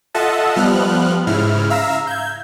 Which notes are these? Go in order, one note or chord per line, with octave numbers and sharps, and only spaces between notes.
F4 A4 D#5 E5 F#5 A5
F3 G3 B3 F6 F#6
G#2 C#3 E4 F6
E5 F5 A#5 E6
G6 G#6